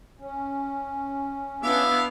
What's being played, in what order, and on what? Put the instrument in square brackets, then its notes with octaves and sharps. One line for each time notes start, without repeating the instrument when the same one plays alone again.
[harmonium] C#4
[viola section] B3 D4 E4 [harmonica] E5 F5 D6